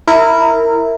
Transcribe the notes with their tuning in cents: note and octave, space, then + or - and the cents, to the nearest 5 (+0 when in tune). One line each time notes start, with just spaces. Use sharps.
E4 -10 A#4 -15